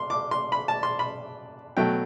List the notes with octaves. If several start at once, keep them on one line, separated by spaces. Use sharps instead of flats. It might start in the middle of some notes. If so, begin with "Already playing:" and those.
Already playing: C6
D6
C6
B5
A5
C6
B5
B2 F#3 A3 G5